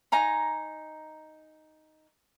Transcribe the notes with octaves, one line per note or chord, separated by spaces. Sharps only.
D#4 G#5 A#5 C6